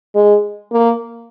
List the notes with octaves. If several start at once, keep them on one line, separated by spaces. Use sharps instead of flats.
G#3
A#3